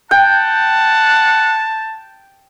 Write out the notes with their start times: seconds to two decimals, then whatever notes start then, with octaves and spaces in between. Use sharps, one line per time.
0.11 F#5 G5 A5